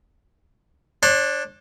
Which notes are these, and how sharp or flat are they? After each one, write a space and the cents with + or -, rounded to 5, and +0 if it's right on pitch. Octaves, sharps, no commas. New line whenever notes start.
D4 +0 C#5 -40 C6 +0